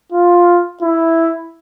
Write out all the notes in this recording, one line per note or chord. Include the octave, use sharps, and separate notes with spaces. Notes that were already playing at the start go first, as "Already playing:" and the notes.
F4
E4